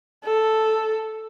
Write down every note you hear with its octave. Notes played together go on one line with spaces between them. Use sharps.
A4